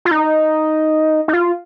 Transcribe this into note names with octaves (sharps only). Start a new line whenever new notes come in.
F4
D#4
D#4
F4